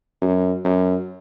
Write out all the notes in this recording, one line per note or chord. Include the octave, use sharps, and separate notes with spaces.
F#2
F#2